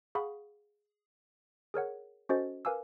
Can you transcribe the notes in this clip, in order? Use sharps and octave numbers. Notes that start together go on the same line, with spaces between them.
G#4 F5 F#5 B5 C#6 D#6
G#4 A#4 C#5 F#5
C#4 F#4 A4 C5 D#5 A6
A#4 B4 F5 G#5 D6 E6